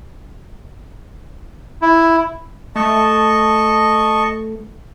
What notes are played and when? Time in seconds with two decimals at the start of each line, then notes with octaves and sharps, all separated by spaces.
1.82 E4
2.76 A3 D#5 A5 C#6